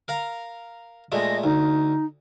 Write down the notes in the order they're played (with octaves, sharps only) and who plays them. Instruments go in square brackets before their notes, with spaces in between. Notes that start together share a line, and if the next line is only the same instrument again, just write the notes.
[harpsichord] A#4 F5 A#5
[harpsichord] A#2 G#3 A3 [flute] D#5
[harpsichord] D2 [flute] D#4